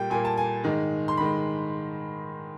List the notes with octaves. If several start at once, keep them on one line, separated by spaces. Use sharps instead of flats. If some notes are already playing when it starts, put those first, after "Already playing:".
Already playing: A#2 G3 A#3 G5
A#2 G3 A#3 G#5
A5
G#5
G#2 D#3 G#3
C6
B5
D#3 G#3